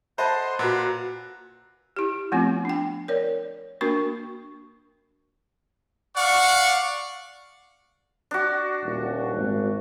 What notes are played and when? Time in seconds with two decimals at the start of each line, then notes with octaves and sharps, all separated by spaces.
0.18 A4 C5 D#5 E5 F#5 A5 B5 C6
0.59 A#2 F#4 B4 F#5 A#5 B5
1.96 E4 G4
2.32 F3 A3 B3 C4 F4
2.65 D4 G5
3.08 A#4 C#5 D5
3.81 A#3 D4 F#4 A#4 C#6
6.16 D5 F5 F#5 C#6
8.31 D4 F#4
8.83 D#1
9.36 G#1